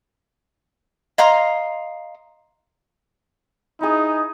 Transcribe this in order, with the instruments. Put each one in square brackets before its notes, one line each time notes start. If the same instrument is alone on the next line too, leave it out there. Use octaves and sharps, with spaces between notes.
[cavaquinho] D#5 F5 A#5 C6
[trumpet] D#4 [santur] E4 G#4